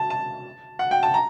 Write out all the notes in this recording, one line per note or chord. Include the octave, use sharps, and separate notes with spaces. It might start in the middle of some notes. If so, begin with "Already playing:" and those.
Already playing: A5
A5
F#5
G5
A5
A#5